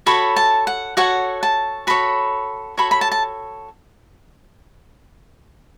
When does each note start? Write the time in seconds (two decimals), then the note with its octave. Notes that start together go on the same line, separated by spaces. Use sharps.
0.06 F#4 A4 C#5 B5
0.36 A5
0.67 F#5
0.97 F#4 A4 C#5 F#5
1.43 A5
1.87 F#4 A4 C#5 B5
2.77 F#4 A4 C#5 B5
2.91 B5
3.01 A5
3.12 A5